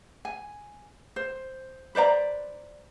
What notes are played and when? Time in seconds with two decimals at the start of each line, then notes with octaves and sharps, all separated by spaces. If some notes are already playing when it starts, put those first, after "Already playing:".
0.25 G#5
1.16 C5
1.95 B4 C5 D5 A#5